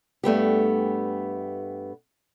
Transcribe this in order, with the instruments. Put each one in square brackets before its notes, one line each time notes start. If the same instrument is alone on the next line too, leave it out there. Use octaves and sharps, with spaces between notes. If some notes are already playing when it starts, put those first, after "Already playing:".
[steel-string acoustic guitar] G2 A3 B3 G4